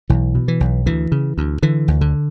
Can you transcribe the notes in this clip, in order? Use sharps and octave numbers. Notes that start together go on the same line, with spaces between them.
B1 E3
B2
E3
B1
D2 E3
C#3
D2
D3 E3
D2
D3